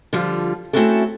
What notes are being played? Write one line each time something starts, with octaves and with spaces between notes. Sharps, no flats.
D3 F3 G3 F4
A3 C4 C#4 E4 F#4 A4